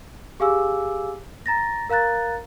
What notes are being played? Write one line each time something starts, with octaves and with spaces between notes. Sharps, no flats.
G4 G#4 F5 G#5 D6 E6
A#5 A6 A#6
A#4 F5 A#5 F#6 A6